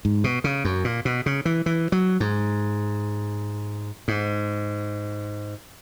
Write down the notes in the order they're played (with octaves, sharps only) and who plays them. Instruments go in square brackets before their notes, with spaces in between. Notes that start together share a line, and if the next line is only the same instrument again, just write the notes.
[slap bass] G#2
B2
C#3
F#2
A#2
B2
C#3
E3
E3
F#3
G#2
G#2